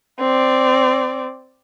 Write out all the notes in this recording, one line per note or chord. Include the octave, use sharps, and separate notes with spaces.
C4 D5